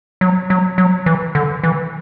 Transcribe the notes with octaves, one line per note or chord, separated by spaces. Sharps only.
F#3
F#3
F#3
E3
D3
E3